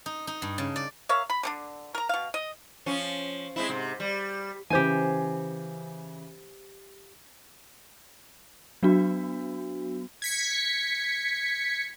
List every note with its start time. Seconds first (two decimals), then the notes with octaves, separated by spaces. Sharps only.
0.06 D#4
0.27 D#4
0.42 G2
0.58 C#3
0.76 D5
1.09 A#4 C#5 E5 F5
1.30 B5
1.43 D3 C4 D4
1.95 A#4 A#5
2.09 B2 F5
2.34 D#5
2.86 F3 C#4
3.56 G#3 C4 E4
3.69 G#2 C3
4.00 G3
4.70 C#3 E3 G4 C5 G#5
8.83 F#3 B3 D4 F#4
10.22 G#6 B6 C#7